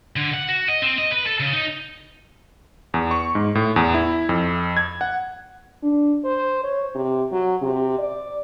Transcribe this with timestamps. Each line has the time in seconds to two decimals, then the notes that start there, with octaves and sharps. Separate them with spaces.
0.16 D3
0.34 F#5
0.49 F#4
0.68 D#5
0.82 C4
0.98 D#5
1.12 B4
1.26 A4
1.40 C#3
1.53 D#4
2.94 E2
3.11 C#6
3.35 G#2
3.55 A2
3.76 E2
3.94 E4
4.29 F2
4.77 G#6
5.01 F#5
5.83 D4
6.24 C5
6.64 C#5
6.94 C3
7.31 F#3
7.62 C3
7.98 D5